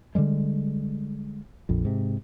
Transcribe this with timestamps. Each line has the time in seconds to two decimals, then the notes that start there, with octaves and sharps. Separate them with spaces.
0.15 D3 E3 G3 G#3
1.69 A#1 F2
1.85 G#2 C3